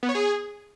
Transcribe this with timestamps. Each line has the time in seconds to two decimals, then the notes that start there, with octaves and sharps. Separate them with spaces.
0.03 B3
0.09 C#5
0.15 G#4